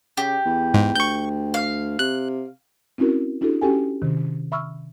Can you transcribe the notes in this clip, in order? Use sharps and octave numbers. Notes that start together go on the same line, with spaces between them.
C#3 G4
E2
G#2
D2 C#6 G6
F5
C3 F#6
C4 C#4 E4 F#4 A#4
D4 E4 F#4 G4 A4
C#4 F#4 G4 A4 G5 G#5
C3 D#3
E5 B5 C#6 E6 F6